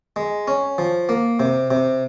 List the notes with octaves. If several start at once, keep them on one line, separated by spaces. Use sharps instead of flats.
G#3
C#4
F3
A#3
C3
C3